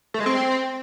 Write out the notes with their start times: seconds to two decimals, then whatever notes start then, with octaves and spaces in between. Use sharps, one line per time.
0.14 A3
0.20 G#3
0.26 C4